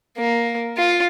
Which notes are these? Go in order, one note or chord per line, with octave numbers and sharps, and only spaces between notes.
A#3
F4